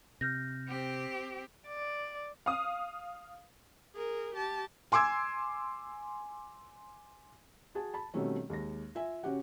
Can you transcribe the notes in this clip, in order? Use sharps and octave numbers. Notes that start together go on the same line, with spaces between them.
C3 F6 G6 A#6
C4 G4
D5
F5 D#6
G#4 A#4
G4 A5
G#5 C6 D6 E6 G#6
F#4 G#4 A5
A5 B5
B2 D#3 G3 A3 C4 C#4
D#2 G#3 A#6
F4 E5 G#5
C#3 C#4 F#4 G4 F#5